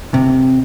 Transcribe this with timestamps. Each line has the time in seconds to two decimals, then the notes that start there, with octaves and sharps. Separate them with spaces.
0.14 C3